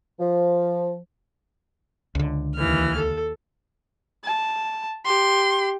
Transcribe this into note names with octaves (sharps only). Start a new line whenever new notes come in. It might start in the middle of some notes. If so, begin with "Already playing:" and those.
F3
C#2 D3
D#2 E3 F6
A4
A5
G4 C6